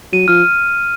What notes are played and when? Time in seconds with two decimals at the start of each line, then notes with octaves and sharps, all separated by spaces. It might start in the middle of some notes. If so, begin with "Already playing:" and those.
0.13 F#3 D#7
0.28 F3 F6